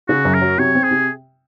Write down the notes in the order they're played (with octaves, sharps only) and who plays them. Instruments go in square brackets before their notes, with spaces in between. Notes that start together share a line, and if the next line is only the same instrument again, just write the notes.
[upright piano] C#3 [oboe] F#4
[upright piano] F#2
[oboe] A#4
[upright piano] F#3
[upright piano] C3 [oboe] C#5
[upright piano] C4
[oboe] G#4
[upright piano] C3